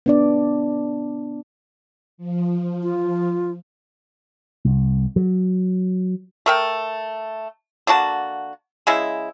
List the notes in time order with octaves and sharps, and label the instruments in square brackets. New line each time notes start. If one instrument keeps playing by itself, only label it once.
[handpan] B3 D4 D5
[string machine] F3
[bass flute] F4
[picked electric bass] C2
F#3
[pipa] A3 A#4 G5
D3 A#3 F#4 A5
C#3 G#3 E4